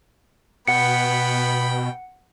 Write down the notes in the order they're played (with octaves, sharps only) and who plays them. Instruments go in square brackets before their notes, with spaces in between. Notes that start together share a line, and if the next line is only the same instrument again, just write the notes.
[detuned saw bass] B2 [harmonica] B3 G5 B5 [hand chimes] F#5 C#7